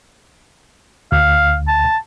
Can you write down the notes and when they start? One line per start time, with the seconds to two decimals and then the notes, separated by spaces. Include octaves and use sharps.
1.12 D2 F5
1.68 A5